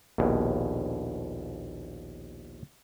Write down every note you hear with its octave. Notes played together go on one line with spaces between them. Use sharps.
A#1 D#2 B2